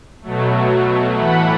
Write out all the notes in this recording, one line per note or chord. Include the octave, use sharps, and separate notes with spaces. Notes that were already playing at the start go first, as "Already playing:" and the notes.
B2 F#3 A3
A2 E3 A3 F#5 B5